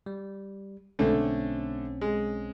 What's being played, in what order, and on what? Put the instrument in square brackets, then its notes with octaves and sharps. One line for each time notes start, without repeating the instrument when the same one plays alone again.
[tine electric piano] G3
[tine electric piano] B1 C4 C#4 [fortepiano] D3 A3
[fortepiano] G#3